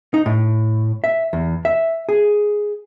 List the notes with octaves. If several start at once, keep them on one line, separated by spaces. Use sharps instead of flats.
D#4
A2
E5
E2
E5
G#4